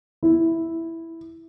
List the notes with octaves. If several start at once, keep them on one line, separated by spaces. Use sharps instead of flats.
E4